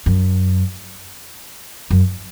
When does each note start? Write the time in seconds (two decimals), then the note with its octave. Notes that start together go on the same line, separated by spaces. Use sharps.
0.06 F#2
1.90 F#2